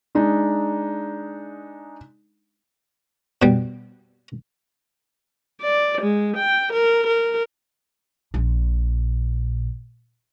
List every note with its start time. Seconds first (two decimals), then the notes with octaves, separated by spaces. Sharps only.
0.15 G#3 D4 D#4
3.42 B2 G3
5.62 D5
6.02 G#3
6.37 G5
6.73 A#4
7.07 A#4
8.34 A#1 A#2